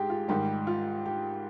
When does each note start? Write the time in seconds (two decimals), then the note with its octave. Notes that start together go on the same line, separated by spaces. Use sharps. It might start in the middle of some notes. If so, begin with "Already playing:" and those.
Already playing: G#2 G4 G#4
0.10 F4
0.28 G#2 D#3 G3 G4
0.67 F4
1.06 G4